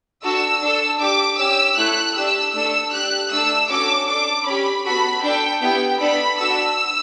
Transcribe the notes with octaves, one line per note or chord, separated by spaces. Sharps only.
D4 F#4 A4 E6
D4 A4
D4 G4 D6
C#4 G4 E6
A3 E4 A4 F#6
D4 G4 E6
A3 D4 A4 E6
D4 G4 F#6
A3 D4 A4 E6
C#4 F#4 A4 D6
D4 A4 D6
C#4 G4 B5
B3 F#4 A4 B5
D4 A4 G5
B3 E4 G4 G5
B3 D4 A4 B5
D4 F#4 A4 E6